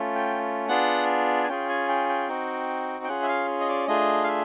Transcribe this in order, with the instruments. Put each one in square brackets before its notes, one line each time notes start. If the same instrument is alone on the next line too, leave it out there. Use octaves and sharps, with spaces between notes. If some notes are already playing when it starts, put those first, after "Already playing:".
Already playing: [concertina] A3 C#4 F4
G5
B3 D4 F4 G#4 F#5
G#5
C#4 F4 G#4 G5
G#5
G5
G5
C4 D#4 F#4
G5
C#4 F4 G#4 F#5
E5
F5
D#5
D5
A3 D4 F4 G#4 D#5
F5
E5